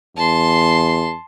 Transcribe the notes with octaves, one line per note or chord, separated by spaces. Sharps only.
E2 A5 C6